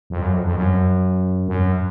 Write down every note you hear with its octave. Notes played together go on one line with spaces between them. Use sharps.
F2
F#2
F2
F2
F#2
F#2